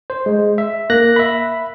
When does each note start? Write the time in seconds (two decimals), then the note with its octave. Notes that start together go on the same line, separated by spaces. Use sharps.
0.10 C5
0.26 G#3
0.58 E5
0.90 A#3 F#6 A#6
1.16 E5 B5